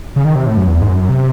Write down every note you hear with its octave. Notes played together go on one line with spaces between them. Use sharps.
C#3
D#3
C3
A2
F#2
E2
G#2
F#2
C3